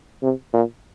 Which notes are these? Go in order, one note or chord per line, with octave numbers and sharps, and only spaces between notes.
C3
A#2